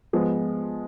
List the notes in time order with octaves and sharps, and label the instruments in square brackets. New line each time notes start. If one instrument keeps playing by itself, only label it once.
[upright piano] F3 G#3 B3